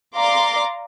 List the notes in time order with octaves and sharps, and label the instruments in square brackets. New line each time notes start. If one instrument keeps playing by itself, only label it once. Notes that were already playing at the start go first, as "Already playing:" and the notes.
[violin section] D5 F5 A#5 C6 D6